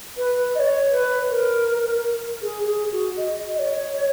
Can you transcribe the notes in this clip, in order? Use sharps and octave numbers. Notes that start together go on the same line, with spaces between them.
B4
D#5
C#5
B4
A#4
G#4
G#4
F#4
D#5
D#5
C#5